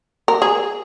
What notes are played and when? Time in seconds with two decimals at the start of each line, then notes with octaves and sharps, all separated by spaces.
0.28 A#4
0.42 G#4